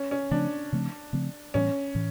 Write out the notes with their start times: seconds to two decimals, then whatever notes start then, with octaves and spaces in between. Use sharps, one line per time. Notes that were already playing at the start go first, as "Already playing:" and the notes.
Already playing: C#4
0.11 C#4
0.31 C#3 F3 A3 C4 D4
0.73 C#3 F3 A3 C4
1.13 C#3 F3 A3 C4
1.54 A2 E3 G3 B3 C#4
1.95 A2 E3